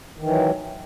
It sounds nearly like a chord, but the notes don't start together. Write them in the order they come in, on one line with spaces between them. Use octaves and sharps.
D#3 E3 F#3